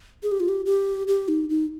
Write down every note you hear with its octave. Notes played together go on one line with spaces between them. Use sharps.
G#4
G4
F4
G4
G4
G4
D#4
D#4